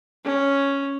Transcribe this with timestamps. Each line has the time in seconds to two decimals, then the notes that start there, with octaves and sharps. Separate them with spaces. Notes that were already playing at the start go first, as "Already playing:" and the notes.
0.24 C#4